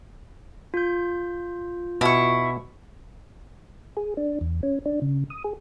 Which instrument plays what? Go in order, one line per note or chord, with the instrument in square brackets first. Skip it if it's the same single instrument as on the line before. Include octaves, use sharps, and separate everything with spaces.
[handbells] F4 G6
[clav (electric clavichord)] B2 [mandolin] E4 C#6
[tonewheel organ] G#4
D4
E2
C#4
D4
C#3
D#6
G#4